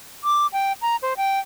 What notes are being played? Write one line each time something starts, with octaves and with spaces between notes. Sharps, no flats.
D6
G5
A#5
C5
G5